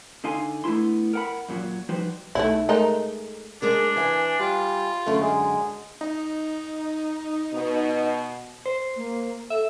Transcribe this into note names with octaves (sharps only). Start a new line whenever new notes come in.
D3 D#4 F5 G#5 C6
A3 B3 D4 E4 C6
A#4 F#5 B5
F#2 A#2 E3 F#3
F3 G3 D#4 F#4 B4 C5
B1 B2 A3 D#4 E4
G#3 A3 D#4 A#4
G#3 D4 G#4 A#4
E3 E5 F5 G#5
G3 F4
F#2 D3 A3
G#3
D#4
B2
C5
A#3
A4 E5